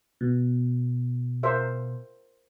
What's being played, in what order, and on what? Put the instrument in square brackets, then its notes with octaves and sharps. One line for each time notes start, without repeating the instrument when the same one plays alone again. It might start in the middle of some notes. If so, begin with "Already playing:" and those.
[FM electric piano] B2
[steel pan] A#4 C5 E5